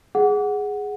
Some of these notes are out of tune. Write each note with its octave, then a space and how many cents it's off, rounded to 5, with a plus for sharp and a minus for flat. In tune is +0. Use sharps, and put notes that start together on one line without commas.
G#4 +0 F#5 +0